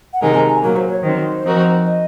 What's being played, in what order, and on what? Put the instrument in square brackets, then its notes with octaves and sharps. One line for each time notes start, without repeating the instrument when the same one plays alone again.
[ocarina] F#5
[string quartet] C3 D#3 G#3 D#4 A#4 [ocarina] G#5
[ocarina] A#5
G#5
[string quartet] A#2 F#3 A#3 [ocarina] A#4
[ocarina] C5
C#5
[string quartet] D#3 F#3 C4 [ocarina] C5
[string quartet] F3 C4 D#4 F#4 A#4
[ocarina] D#5